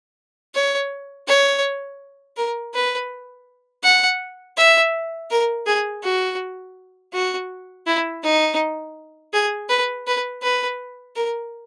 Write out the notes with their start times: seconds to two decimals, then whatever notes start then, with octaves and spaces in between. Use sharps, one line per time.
0.55 C#5
1.28 C#5
2.37 A#4
2.74 B4
3.84 F#5
4.57 E5
5.31 A#4
5.66 G#4
6.04 F#4
7.13 F#4
7.87 E4
8.23 D#4
9.33 G#4
9.69 B4
10.07 B4
10.43 B4
11.16 A#4